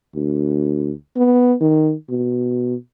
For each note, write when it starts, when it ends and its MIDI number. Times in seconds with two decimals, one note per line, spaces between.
0.15 0.91 38
1.16 1.54 59
1.60 1.93 51
2.09 2.74 47